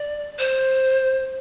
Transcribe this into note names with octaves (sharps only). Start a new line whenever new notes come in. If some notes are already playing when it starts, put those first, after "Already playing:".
Already playing: D5
C5